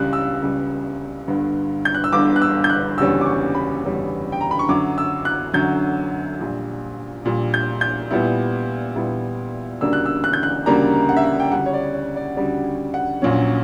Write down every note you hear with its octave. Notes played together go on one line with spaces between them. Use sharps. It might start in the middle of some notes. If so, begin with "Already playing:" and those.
Already playing: C#2 C#3 G3 F#6
E6
C#2 C#3 G3
G1 G2 D3
G6
F#6
E6
G1 G2 D3 D6
F#6
E6
G6
F#6
F#1 E2 D3 G3 C#4 E6
D6
C#6
B5
F#1 E2 D3 G3 C#4
G5
A#5
B5
C#6
F#2 D3 F#3 D6
E6
F#6
F#2 D3 F#3 G6
A#1 A#2 G3
A#1 A#2 G3
G6
G6
A#2 G3 B3 E4
A#2 G3 B3 E4
D2 C#3 G3 A#3 D4 E6
F#6
E6
F#6
G6
F#6
D2 C#3 G3 A#3 D4 A#5
F#5
E5
F#5
G5
D2 C#3 G3 F#5
C#5
D5
C#5
D5
D2 C#3 G3 D5
F#5
A#1 A#2 F#3 C#4